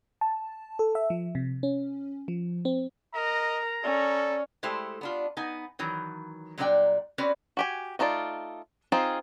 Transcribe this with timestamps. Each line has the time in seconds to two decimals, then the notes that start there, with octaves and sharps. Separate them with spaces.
0.21 A5
0.79 A4
0.95 E5
1.10 F3
1.35 C3
1.63 C#4
2.28 F3
2.65 C4
3.14 A#4 D#5 A#5
3.83 C#4 A4 D5
4.63 G#3 A3 E4 G4 A4 C5
5.01 B3 D4 F4
5.37 B3 D#4 G#5
5.79 D#3 E3 F#3
6.58 A#2 F#3 G3 D4 D5 G5
7.18 C4 C#4 F#4 B4 D5
7.57 F#4 G4 G#5
7.99 A3 D#4 F4 C5 D5
8.92 C4 D#4 F4 G#4